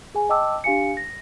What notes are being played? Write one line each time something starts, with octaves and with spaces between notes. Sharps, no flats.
G#4 G#5
D#5 G5 A5 D6 E6
D4 G4 F5 G#5 C#7
A#6